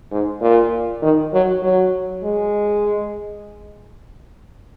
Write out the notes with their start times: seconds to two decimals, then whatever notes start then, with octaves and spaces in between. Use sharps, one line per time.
0.12 G#2
0.41 A#2
1.02 D#3
1.33 F#3
1.63 F#3
2.24 G#3